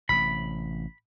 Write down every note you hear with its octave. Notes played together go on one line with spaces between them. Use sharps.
A1 C3 B5